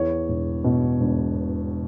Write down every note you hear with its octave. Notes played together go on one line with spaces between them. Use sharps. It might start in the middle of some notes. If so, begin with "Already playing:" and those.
Already playing: E2 C#5
E1
B2
E1